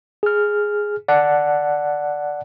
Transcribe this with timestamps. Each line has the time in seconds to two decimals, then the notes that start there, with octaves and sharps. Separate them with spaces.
0.23 G#4 F6
1.08 D5 F#5 A5